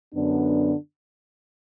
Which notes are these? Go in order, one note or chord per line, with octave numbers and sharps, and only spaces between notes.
F#2 D3 B3 D4